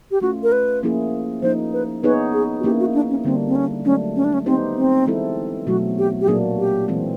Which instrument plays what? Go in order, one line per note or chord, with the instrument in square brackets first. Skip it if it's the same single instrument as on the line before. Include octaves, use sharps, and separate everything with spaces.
[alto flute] G4
[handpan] A3 C#4 F4 [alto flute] F#4
[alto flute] A#4
B4
[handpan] F3 A#3 C#4 E4 G#4
[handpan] F3 A#3 D#4 [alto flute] C5
[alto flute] B4
[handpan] B3 D#4 G#4 C#5 [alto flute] B4
[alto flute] G#4
F#4
[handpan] A#3 C#4 E4 [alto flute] G4
[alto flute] F#4
D4
C#4
[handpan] D3 G3 A#3 D4 [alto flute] C4
[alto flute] C4
C#4
[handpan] F#3 A3 D4 [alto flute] C#4
[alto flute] C#4
D4
C#4
[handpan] B3 D#4 G4 C5 [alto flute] C4
[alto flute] C4
[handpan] E3 G#3 C4 E4 A4
[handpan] B2 F#3 A3 [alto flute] F#4
[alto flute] G4
G4
[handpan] A#2 F#3 A#3 D4 [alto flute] G#4
[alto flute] G4
[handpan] E3 G#3 C4